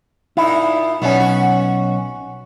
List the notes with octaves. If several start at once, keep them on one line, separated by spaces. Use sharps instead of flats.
A#2 D#4 E4
B1 F#3 G3 B3 C#4
F#4